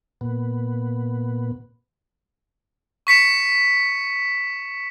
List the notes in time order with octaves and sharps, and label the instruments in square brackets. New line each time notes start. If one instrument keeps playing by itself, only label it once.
[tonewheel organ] A#2 B3
[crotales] C#6 B6 C#7 E7